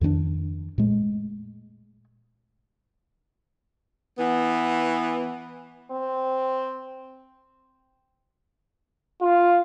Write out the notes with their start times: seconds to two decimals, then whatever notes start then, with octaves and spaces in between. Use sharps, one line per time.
0.01 F2 D#3 C4 D4
0.78 A#2 G#3 A3
4.19 E3 B3
5.91 C4
9.22 F4